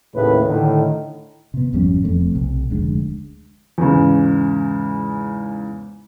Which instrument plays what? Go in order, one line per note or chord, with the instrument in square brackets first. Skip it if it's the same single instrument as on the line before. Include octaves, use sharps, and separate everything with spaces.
[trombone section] D#2 A2 C#3 B4
A2 D3 D#3
[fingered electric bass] C3 B3
G#1 F2 G3 C#4
E1 F2 A3 C4
B1 C3
F1 D2 G#3 D4
[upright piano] E2 G#2 C#3